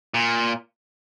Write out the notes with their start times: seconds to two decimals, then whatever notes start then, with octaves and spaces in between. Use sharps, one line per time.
0.14 A#2